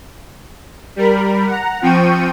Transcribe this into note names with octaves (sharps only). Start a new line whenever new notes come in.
G3 A#4 B5
F#5 A#5
F3 C4 G5 C#6 D#7